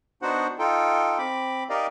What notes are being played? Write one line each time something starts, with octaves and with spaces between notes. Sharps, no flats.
B3 D4 D#4 F#4 C5 F#5
D#4 F4 A4 G5
C4 B5 D6
D#4 G4 A#4 D5 D#5 F5